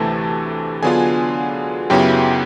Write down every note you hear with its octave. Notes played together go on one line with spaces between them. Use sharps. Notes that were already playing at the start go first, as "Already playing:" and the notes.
Already playing: D2 C3 E3 A3 A4 A5
D3 F#3 B3 D4 F4 G#4 G#5
F#2 C#3 F#3 B3 E4 G4 G5